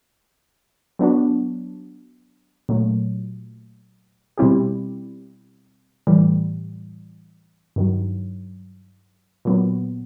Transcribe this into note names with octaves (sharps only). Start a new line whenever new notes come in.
F#3 B3 D4 F#4
A#2 F#3 A3
B2 G3 C4 E4 G4
A2 E3 G3
G2 D#3 F#3
A#2 F#3 B3